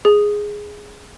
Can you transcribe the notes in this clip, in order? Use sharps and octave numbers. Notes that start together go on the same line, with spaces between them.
G#4